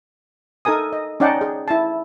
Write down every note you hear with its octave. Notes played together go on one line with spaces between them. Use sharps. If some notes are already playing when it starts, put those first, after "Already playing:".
D#4 A4 A#4 G#5 D#6
D#5
C#4 D#4 D5 F#5 G5 A5
G#4
E4 A5